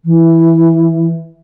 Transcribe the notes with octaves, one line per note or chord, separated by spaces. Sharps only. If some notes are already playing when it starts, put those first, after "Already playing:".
E3